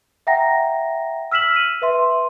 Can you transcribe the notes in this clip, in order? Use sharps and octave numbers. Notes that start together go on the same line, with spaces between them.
E5 F#5 G5 A#5 A#6
E6 F6 B6 E7 F#7
D#7
B4 E5 C6